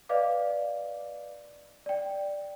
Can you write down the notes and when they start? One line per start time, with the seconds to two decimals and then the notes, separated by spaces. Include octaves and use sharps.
0.09 B4 D5 D#5 F5 D6
1.86 D5 G5